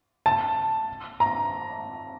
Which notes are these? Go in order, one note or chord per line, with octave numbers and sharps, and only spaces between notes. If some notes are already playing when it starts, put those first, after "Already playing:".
A5
A#5